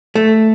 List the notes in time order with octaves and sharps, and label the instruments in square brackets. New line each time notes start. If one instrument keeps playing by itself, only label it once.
[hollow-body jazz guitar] A3